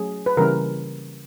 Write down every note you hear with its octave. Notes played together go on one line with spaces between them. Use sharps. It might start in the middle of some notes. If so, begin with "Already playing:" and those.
Already playing: F#3 A3 C#4 G#4
B4
C#3 E3 G3 A#3 C#4 A#4